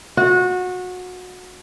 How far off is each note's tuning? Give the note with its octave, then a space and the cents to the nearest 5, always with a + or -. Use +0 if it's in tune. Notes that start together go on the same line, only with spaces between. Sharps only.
F#4 -25